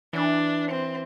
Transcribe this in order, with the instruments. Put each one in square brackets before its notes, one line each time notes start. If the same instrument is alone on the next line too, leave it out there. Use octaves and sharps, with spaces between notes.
[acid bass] E3 [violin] D4
[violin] C4